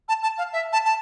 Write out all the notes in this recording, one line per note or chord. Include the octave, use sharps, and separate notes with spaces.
A5
A5
F5
E5
A5
A5